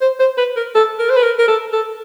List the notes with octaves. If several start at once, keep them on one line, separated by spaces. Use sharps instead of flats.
C5
C5
B4
A#4
A4
A#4
C5
B4
A#4
A#4
A4
A4